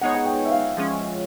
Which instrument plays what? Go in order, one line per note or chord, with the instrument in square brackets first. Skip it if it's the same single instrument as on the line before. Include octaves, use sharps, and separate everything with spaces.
[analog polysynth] G#3 B3 D#4 G#4 C#5 [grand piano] F#5
[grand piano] F#5
G5
E5
F5
[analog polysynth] F3 G#3 C#4